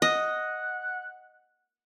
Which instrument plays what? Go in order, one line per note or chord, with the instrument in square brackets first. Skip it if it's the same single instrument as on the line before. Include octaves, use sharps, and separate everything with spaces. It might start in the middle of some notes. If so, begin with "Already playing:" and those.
[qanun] D#5 [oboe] F#5